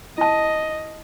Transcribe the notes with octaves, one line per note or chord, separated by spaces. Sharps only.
E4 D#5 A5